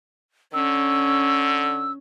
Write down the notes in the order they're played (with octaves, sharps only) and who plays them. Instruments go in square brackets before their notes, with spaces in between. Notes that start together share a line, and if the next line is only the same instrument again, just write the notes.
[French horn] D3 [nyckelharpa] C#4 [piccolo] E6